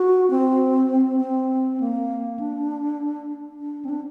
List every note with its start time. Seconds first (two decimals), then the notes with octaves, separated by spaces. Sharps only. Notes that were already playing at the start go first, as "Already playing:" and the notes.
Already playing: F#4
0.30 C4
1.20 C4
1.80 A#3
2.39 D4
3.60 D4
3.85 C4
3.89 D4